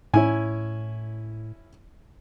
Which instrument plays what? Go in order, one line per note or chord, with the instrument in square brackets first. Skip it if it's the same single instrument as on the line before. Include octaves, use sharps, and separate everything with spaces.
[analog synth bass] A2 [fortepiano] C#4 E4 G#5